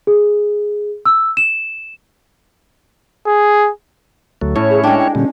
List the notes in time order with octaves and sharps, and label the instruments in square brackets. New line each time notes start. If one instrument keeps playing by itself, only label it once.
[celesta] G#4
E6
E7
[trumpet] G#4
[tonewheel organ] D2 F#3 A3
[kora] A2 [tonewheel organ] C#4 E4 C#5
[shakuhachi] G#4
[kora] G#3 D4 [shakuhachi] G5
[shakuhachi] G5
[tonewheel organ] A#2 D3 G3 [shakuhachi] C#4